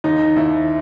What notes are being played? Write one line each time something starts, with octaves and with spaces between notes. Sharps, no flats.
D#2 D#4
D#2 E4